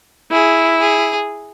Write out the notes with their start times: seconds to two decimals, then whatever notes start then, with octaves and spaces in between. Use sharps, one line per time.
0.31 E4 G#4
0.80 G#4